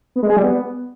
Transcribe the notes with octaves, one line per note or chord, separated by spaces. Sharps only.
B3
G#3
G#4
G3
B3